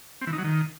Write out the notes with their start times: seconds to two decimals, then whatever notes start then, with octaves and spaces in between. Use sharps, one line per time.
0.21 C4
0.27 E3
0.33 D#4
0.38 F#3
0.44 D#3